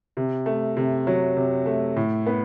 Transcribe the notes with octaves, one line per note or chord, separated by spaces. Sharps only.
C3
A3
C3
F#3
C3
A3
A2
B3